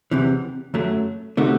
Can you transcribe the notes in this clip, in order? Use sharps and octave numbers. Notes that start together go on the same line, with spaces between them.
E2 C3 E3
F#2 F#3 A3
C3 D#3 A3 D#4 F#4